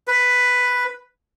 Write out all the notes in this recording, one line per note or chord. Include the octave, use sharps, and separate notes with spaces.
B4